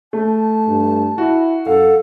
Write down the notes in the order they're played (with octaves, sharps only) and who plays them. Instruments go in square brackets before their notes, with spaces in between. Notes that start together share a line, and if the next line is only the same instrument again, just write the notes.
[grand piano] A3 [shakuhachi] A5
[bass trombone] G2
[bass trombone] E4 [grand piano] F#4
[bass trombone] F#2 [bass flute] A4 [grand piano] F5 [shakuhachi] F#5